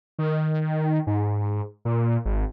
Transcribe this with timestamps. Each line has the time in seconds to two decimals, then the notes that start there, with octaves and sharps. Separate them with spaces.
0.19 D#3
1.07 G#2
1.85 A#2
2.25 G#1